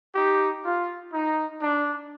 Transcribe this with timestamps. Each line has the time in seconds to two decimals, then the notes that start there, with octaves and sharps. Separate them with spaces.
0.15 D#4 G4
0.65 F4
1.13 D#4
1.61 D4